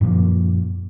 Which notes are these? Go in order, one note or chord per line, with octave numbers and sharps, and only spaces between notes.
F#2 A#2 F3 A#3